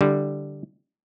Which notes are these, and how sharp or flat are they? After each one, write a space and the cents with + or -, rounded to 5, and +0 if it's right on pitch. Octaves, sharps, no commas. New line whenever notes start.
D3 +0 G3 +0 E4 +0